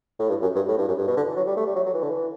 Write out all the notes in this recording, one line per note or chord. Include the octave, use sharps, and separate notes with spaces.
A2
G2
F#2
G2
A2
G2
F#2
G2
B2
D3
E3
F#3
G3
A3
G3
F#3
F#3
E3
D3
E3